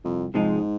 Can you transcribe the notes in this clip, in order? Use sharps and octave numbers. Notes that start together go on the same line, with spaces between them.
C2 F2
G#2 C3 F3 G#3 D#4